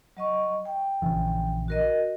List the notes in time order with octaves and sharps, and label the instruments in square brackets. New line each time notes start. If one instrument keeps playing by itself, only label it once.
[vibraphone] F#3 D#5 C#6
G5
[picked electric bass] A#1 C#3 E3
[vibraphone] F#4 A#4 D#5